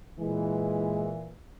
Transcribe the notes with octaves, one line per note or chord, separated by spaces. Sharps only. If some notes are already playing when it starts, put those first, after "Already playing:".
A#2 E3 G#3